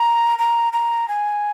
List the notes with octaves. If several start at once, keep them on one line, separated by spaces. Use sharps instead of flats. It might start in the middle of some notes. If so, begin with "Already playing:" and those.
Already playing: A#5
A#5
A#5
G#5